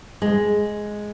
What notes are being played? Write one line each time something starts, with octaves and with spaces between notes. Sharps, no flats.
G#3